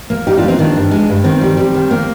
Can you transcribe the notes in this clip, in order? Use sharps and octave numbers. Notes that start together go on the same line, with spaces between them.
A#3
G3 D#4 G4
D4 F4
G3
C4 D#4
D#3 D4
G2
G#3
G2
D#3 C4
G3
G3
D#3
A#3